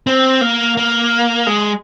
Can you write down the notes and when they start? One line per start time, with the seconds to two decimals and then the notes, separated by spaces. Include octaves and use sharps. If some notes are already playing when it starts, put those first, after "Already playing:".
0.07 C4
0.41 A#3
0.77 A#3
1.47 G#3